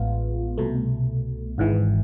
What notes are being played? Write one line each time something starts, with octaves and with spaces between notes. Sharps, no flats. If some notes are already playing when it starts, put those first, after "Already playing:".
Already playing: A1 A2 G#3 B3 F4
C2 B2 A3
G#1 G#2 E3